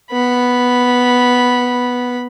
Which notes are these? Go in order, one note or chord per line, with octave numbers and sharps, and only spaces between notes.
B3 B5